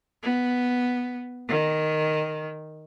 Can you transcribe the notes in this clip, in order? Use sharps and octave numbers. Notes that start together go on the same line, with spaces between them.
B3
D#3